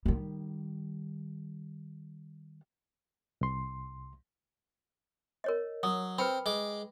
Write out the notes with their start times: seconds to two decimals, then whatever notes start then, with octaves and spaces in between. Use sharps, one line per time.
0.06 D#3 G3
3.41 C2 C6
5.44 A#4 C#5 D#5
5.83 F#3 D#6
6.19 C4 B4 G5 B5
6.46 G#3 D6